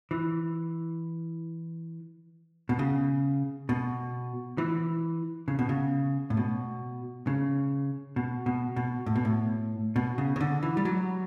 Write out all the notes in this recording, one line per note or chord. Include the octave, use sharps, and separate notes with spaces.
E3
B2
C#3
B2
E3
C#3
B2
C#3
A2
B2
C#3
B2
B2
B2
A2
B2
A2
B2
C#3
C#3
D3
E3
G3
F#3